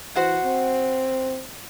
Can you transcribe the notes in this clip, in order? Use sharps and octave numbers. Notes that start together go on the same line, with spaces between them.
E3 F#4 C5 F#5
C4